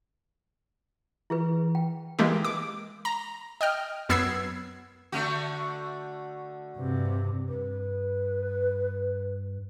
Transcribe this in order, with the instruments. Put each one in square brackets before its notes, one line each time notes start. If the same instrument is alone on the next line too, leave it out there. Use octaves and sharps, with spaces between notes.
[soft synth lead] E3 [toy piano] E4 G#4 B4
[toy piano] G5
[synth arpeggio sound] E3 G#3 A#3 G4
D6
A#5
D#5 G5 F6
F#2 B3 E6 G#6 C7
[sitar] D3 A3 F#4
[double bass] G2 C3
[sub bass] G2 [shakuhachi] B4